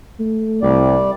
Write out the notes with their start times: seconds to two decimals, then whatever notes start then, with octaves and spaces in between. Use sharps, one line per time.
0.19 A3
0.62 C2 G3 D5